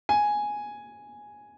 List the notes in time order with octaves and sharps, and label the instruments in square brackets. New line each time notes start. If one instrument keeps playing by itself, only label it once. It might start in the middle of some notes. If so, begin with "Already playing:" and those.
[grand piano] G#5